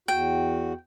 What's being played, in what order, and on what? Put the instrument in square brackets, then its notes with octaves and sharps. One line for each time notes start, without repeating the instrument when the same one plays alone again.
[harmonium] E2 F#4 [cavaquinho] G5